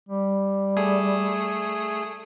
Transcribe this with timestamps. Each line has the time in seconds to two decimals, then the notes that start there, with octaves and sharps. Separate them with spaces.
0.09 G3
0.77 A3 G#4